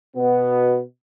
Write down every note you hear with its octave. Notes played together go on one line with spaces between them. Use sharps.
B2 B3